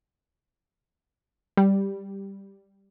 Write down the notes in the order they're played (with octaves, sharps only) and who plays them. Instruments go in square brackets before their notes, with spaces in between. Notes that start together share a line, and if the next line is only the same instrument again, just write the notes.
[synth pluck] G3